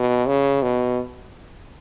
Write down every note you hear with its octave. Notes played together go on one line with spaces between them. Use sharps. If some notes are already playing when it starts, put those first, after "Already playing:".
Already playing: B2
C#3
B2